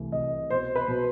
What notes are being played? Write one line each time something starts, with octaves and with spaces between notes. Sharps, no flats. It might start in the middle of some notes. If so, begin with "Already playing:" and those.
Already playing: C2 E3 A3
C2 D#5
B2 C5
B4
B2